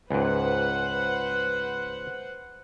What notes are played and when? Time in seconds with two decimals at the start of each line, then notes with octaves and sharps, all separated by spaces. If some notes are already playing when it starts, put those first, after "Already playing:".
0.10 C#2 G#2 B4 C5 F#5